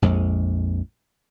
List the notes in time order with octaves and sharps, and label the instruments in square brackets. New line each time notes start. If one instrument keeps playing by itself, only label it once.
[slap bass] A#1 F2 G#3